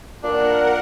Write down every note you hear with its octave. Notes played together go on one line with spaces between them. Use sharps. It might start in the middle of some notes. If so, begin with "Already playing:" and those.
A#2 D4 A#4 F#5